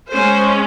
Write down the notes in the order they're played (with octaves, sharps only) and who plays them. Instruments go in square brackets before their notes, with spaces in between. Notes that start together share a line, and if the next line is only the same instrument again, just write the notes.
[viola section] G#3 C#4 C5